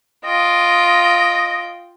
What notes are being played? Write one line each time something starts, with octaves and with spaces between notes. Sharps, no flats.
F4 D#5 G5